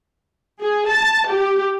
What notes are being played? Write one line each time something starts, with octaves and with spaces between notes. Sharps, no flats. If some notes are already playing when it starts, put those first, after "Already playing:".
G#4
A5
G4